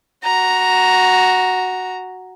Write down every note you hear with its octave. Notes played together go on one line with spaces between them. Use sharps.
F#4 A#5